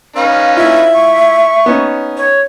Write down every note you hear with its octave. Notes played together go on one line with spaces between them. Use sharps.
C#4 D#4 B4 F5
E4 F4 E5
C#6
B3 C#4 D#4
C#5